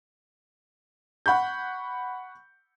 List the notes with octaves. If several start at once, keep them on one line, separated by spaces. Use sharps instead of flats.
F#5 B5 C#6 G6